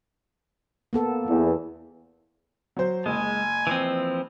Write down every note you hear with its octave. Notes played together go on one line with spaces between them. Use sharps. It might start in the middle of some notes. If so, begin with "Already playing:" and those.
A#3 B3 A4
E2
F#3 C5
F#1 G#3 G#5
E3 F3 C4